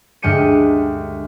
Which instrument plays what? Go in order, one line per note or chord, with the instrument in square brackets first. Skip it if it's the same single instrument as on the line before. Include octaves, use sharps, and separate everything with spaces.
[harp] D2 G2 G#3 G5 C#7 D#7